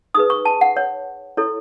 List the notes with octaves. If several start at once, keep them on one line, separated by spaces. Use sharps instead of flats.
D#4 G#4 B4 D#6
C#6
A5
F#5
C#5
E4 A4 C#5